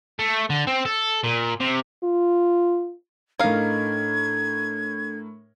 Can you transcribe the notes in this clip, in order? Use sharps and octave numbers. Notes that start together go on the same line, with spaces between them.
A3
D3
C4
A4
A#2
C3
F4
A2 D4 D#4 A4 A#4 F5 G#6